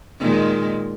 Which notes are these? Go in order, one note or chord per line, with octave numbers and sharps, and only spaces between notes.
A#2 D#3 G#3